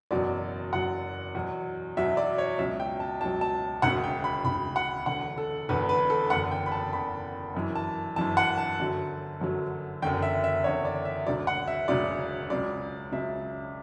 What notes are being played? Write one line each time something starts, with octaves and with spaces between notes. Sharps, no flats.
F#1 E2 B2 F#3 D5
F#1 E2 B2 F#3 F#5
E2 B2 F#3
E2 B2 F#3 E5
D5
C#5
C#2 B2 F#3 E5
G5
A5
C#2 B2 F#3 A5
A5
E1 D2 C#3 F#5
G5
B5
E1 D2 C#3 B5
F#5
E1 E2 D3 F#5
A4
E1 E2 D3 B4
B4
A4
F#1 E2 D3 F#5
G5
B5
A5
F#1 E2 D3 B5
G1 F#2 E3
A5
G1 F#2 E3 A5
F#5
A5
G1 F#2 D3 F#3
G1 F#2 D3 F#3
F#1 E2 D3 G5
E5
E5
F#1 E2 D3 C#5
D5
E5
E1 D2 C#3 F#3 D5
F#5
E5
E1 D2 C#3 F#3 D5
C#2 C#3 F#3 D5
C#2 C#3 F#3 E5